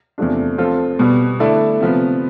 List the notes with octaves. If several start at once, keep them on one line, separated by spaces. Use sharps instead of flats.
E2 C3 F3 A3 D4
F3 C4 F4 A4
B2 G3 B3
D3 A3 E4 A4 D5
C3 F3 B3